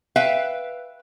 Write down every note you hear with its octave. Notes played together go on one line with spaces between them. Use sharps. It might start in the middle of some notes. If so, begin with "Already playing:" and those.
B4 E5 F5 G5